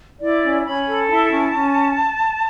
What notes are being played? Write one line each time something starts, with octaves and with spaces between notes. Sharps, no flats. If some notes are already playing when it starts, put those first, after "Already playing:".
E4 D5
C#4
C#4 B5
A4
B5
E4 A5
C#4
C#4